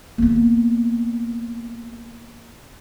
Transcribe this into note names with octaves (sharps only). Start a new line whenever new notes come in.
A#3 B3